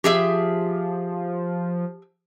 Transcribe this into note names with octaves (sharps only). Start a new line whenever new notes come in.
F3 G4 G#4 E5